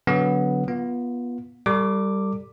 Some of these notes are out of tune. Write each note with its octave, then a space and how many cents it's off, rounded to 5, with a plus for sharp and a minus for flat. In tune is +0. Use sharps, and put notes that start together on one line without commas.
D3 -30 F#3 +0 B3 +0
B3 -25 F4 +0
G3 +0 A4 +40 D6 +0